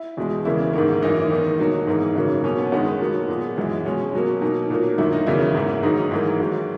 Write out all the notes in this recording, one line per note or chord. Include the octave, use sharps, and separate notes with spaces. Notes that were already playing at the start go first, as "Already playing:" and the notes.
Already playing: E4
E2 B2 G#3
E2 C#3 E3 A#3 E4
G#2 D#3 A#3
F#2 E3 A#3 D#4
E2 D#3 A#3
B2 F#3 A#3 D#4
G#2 E3 A#3
F#2 C#3 F#3 A#3
B2 A#3 C#4
B3
F#2 D#3 G#3 B3
B2 F#3 A#3
A#2 G#3
F#2 E3 G#3
B2 G#3 C#4
B2 F#3 A#3
B2 A#3 D#4
A#2 F#3 A#3
F#2 D#3 F#3 A#3 E4
D#4
E2 C#3 F#3 A#3 E4
G#2 E3 A#3
G#2 D#3 F#3 A#3 D#4
D#4
G#2 E3 A#3 E4
G#2 D#3 F#3